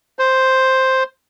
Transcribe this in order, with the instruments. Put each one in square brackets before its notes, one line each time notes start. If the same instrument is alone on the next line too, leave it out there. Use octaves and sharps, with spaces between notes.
[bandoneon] C5